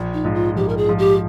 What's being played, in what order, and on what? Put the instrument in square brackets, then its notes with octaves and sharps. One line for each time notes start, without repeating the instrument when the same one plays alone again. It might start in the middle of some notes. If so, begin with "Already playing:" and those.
Already playing: [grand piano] A#1
[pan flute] D#4
[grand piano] G#2 F3
[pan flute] F4
[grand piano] A#1 [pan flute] G4
[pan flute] A#4
G#4
[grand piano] G#2 F3
[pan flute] G4